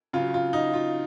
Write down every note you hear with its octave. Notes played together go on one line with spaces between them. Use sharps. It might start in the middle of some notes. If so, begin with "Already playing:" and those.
C#3 F#3 F4
F4
D#4
F4